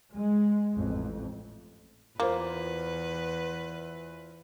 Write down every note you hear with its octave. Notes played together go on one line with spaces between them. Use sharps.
G#3
A1 F2
E2 A#3 F4 B4 C5